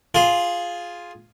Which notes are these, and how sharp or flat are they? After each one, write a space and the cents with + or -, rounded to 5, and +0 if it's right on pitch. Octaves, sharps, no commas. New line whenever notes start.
F4 +0 G#4 +0